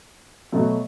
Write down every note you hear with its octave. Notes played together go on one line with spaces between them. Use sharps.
B2 F#3 A3